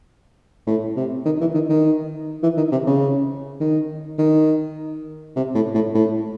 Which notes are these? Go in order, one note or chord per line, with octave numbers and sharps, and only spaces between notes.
A2
C3
D#3
E3
D#3
D#3
E3
D#3
C3
C#3
D#3
D#3
C3
A2
A2
A2